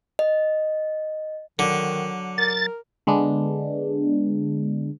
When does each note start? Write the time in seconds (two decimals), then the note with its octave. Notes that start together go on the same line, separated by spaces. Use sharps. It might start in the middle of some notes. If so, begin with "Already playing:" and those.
0.19 D#5
1.59 D3 D#3 F#3
2.38 A#4 A6
3.07 D3 G#3 B3 D4